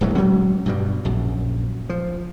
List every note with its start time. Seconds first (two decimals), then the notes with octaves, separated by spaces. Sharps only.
0.01 D1 A1 F#3 A3
0.15 D#1 F#3 G#3 C#4
0.66 G2 B2 G3
1.05 A#1 F#2
1.89 F3